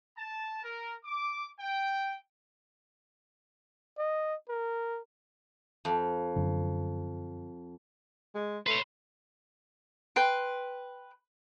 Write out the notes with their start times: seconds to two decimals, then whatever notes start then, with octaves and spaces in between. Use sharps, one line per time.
0.17 A5
0.62 A#4
1.04 D6
1.60 G5
3.98 D#5
4.49 A#4
5.85 F2
6.36 F#2 D3
8.35 G#3
8.66 A3 B4 C#5 C6
10.16 B4 G5 C6